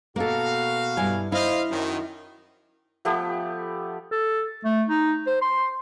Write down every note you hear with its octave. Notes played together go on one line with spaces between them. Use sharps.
B2 A#3 F#4 A4 F5
G2 E4 G#5
E4 C5 D#5 F5
F#2 D#3
F3 A3 B3 G4
A4
A3
D#4
C5
C6